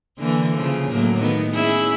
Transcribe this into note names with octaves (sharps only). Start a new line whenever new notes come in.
D3 E3 A#3
C#3 F3
A2 F#3 A#3
D#3 B3
C#4 E4 G#4